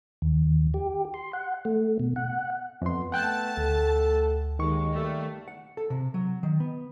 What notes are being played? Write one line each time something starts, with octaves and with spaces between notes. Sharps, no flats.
D#2
G4
C6
F#5
A3
B2
F#5
F2 B3 C6
A3 F#5 G5 A5 F#6
D2 A4
D#2 D#3 G#3 C#6
G3 A3 A#3
F#5
A4
C3
F#3
D#3
B3